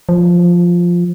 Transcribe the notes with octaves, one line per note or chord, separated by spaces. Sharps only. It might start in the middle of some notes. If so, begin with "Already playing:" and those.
F3